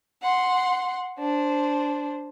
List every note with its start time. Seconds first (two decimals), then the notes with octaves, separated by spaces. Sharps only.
0.22 F#5 C6
1.19 D4 C5